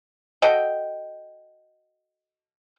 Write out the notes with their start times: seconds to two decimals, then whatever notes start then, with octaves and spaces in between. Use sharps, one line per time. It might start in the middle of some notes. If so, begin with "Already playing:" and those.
0.42 F#4 A4 D#5 G5